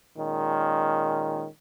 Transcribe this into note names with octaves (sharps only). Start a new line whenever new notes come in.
A#2 D#3 G#3 C#4